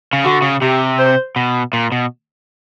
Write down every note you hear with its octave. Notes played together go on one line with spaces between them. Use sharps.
C#3
D3 F#4
C#3
C3 G4
C5
B2
A#2
B2